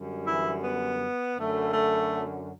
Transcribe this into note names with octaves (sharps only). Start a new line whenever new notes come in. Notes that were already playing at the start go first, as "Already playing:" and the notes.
Already playing: F#2 D3 G3
E3 E4
B3
F#2 D3 F#3 A3
A3